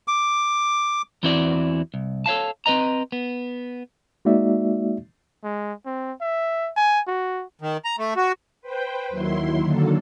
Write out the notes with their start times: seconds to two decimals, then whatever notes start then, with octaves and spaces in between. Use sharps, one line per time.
0.08 D6
1.23 E2 E3 C4 E4 F#4 D5
1.94 C2
2.26 A4 C#5 F5 A5
2.66 C4 B4 D#5 A#5
3.12 B3
4.25 G#3 A#3 D#4 F#4 D5 E5
5.44 G#3
5.86 C4
6.21 E5
6.76 G#5
7.07 F#4
7.61 D#3
7.85 A#5
7.98 A3
8.16 F#4
8.62 B4 C5 G5
9.09 D#2 D#3 F#3 E4 C6
9.61 D3 D#3 F#3 A#3 A4